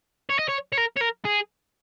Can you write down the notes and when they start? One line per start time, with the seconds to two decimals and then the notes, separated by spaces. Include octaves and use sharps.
0.29 C#5
0.39 D#5
0.48 C#5
0.73 C#5
0.78 A#4
0.97 C#5
1.01 A#4
1.25 G#4